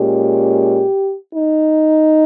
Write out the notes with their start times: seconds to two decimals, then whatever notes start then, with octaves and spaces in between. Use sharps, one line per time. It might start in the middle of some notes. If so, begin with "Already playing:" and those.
Already playing: A#2 G#3 C#4 G4
1.33 D#4